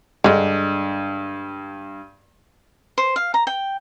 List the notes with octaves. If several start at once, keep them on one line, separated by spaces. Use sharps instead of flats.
G2 D3 G#3
C5
F5
A#5
G5